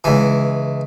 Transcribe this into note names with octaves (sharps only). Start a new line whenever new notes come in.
C#2 E3